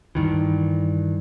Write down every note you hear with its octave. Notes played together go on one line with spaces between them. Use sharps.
G2 D#3 E3